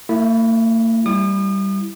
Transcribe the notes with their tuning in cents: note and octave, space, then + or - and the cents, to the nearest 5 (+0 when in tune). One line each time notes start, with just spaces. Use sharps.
A#3 -45 E4 +0
G3 -5 E4 +0 D#6 -40